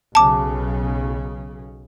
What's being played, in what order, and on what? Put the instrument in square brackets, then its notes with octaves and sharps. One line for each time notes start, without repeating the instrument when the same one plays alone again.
[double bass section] B1 C#3 [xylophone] A5 D6